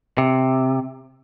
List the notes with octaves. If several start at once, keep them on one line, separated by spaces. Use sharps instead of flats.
C3